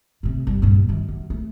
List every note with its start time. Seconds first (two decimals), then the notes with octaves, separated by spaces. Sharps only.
0.23 A2 C3
0.47 G1 G3
0.62 G2 A#2
0.89 F#2 D#3
1.08 F#2
1.30 A3